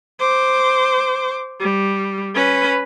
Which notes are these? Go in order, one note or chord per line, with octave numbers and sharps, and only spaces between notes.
C5 D6
G3
C#4 B4